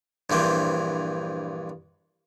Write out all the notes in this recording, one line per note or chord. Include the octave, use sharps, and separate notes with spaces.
A#1 G2 E3 C4